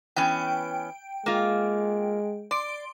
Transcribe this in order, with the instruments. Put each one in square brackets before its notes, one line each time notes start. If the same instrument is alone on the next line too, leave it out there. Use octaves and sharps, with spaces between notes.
[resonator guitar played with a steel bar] E3 B3 C#4 [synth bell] G5
[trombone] G#3 [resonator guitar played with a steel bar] A#3 F4
[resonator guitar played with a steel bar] D5 [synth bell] C6 D7